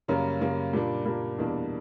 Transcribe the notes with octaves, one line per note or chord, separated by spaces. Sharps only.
F#2 C#3 G3 A#3 C#4
F#2 C#3 G3 A#3 C#4
A#2 G3 A#3 D4
A#2 G3 A#3 D4
E2 B2 G3 A#3 D4